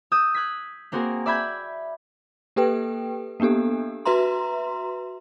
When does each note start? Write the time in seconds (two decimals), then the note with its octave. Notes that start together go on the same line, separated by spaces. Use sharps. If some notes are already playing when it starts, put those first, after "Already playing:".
0.12 D#6 E6 G6
0.34 F#6 G#6 B6
0.92 A#3 C4 F#4 G#4 A#4
1.26 D5 E5 B5 G6 G#6
2.56 A#3 G4 A4 B4 G5
3.40 A#3 B3 D4 G4 A4
4.05 F#4 B4 E5 A#5 C6